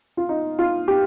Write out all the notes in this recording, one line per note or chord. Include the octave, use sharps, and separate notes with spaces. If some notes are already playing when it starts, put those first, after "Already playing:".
F4
D#4
F4
G4